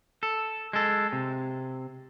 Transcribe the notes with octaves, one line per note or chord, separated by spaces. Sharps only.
A4
G#3 A4
C3